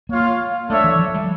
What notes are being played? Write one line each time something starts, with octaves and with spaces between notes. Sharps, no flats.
A#3 F4 C#5 F5
A3 D4 A4 C#5 E5
E3
F3
G3